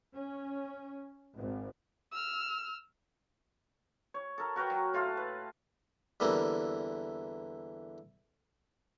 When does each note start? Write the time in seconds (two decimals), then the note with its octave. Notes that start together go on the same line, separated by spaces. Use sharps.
0.13 C#4
1.37 G#1
2.12 E6 F6
4.14 C#5
4.38 A4 A#4
4.56 F#4 A#4 B4 G5
4.70 F#3
4.94 A2 F4 A4
5.17 B4
6.20 E2 D3 E3 G3 A#3